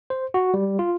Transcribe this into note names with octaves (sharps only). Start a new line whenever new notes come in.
C5
F#4
G3
F4